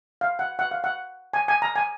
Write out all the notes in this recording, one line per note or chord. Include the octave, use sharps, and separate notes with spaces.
F5
F#5
F#5
F5
F#5
G#5
G#5
A#5
G#5